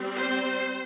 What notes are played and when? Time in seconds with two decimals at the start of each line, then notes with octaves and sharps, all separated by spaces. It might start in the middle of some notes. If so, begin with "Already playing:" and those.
Already playing: G3 C4
0.16 C5